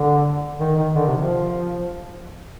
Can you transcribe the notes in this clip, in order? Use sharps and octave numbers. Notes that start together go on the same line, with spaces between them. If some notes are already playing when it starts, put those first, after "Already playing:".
Already playing: D3
D#3
D#3
D3
C3
F3